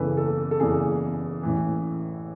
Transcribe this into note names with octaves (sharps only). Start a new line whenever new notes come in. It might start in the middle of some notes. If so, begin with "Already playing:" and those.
Already playing: F#1 E2 C#3 E3 A4 B4
A4
A4
F#1 E2 C#3 E3 G#4
A1 A2 E3